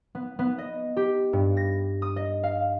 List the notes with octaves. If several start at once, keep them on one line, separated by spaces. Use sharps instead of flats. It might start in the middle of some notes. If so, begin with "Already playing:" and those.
B3
B3
D#5
G4
G2
A#6
D#6
D#5
F5